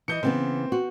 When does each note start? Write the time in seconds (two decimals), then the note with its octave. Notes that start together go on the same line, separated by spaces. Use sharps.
0.08 E3 D#5 G6 C#7
0.23 C#3 E3 B3 C4
0.72 F#4